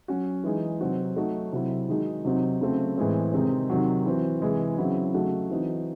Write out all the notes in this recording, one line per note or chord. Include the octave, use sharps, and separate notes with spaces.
F#3 C#4 F#4
E3 G#3 D#4
C3 F#3 C4 D#4 F#4
F#3 A3 D#4 F#4
C3 F#3 C4 E4
D#3 G#3 D#4 F#4
C3 F#3 C4 D#4
C#3 F#3 A3 C4
A2 E3 G#3 C4
C3 D#3 G#3 C4 D#4
C3 D#3 F#3
E3 C4 F#4
C3 E3 G#3
C#3 F#3 C4 E4
C#3 F#3 A3 D#4 F#4
E3 C4 D#4 F#4